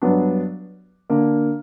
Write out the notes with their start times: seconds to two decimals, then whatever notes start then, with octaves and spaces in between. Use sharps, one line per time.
0.02 G2 F#3 B3 D4
1.10 D3 A#3 D4